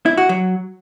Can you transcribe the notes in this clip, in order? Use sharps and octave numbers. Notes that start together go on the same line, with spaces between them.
E4
F#4
F#3